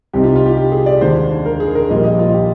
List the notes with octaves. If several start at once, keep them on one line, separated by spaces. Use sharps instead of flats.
C2 C3 G3 C4 D#4 G4
F4
F4
G4
G4
G#4
D5
D#2 D3 G#3 D4 C5
A#4
G#4
A#4
A#1 A#2 G3 D#5
D#5
F4
G4